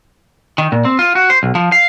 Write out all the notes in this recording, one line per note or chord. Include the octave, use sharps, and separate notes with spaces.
D#3
A#2
C4
F4
F#4
C5
B1
F3
F5